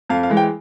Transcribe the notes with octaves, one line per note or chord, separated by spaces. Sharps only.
F2 F5
F5
E3 G#3
G5